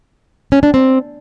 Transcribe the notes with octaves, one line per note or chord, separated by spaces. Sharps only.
C#4
D4
C4